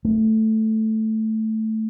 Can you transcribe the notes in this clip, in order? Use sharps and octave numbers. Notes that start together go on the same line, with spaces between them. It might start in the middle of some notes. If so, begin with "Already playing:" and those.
A3